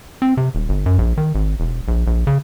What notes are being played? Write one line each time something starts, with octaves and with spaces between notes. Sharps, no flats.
C4
C3
D#1
G1
F#2
A#1
D#3
G#1
E1
A#1
A#1
C#3